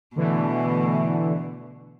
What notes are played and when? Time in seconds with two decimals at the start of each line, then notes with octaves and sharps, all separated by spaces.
0.16 B2 D3 E3 A3